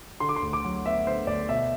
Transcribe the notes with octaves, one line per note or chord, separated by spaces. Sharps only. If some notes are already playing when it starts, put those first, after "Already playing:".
D3 C6
D6
C6
D2
D6
F#3
B3 E5
D3 C5
D2 D5
B2 E5